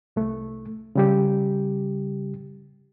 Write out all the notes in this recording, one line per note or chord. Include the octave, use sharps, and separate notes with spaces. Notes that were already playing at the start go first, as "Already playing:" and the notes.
C2 A3
C#3 G3 G4